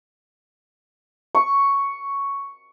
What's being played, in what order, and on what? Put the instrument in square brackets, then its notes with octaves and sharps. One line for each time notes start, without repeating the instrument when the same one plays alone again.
[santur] C#6